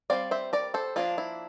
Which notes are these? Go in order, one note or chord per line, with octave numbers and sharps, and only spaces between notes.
G3 C4 D5 F5
C5 E5
A#4 D5
A4 C5
F3 A#3 D4 F4
E4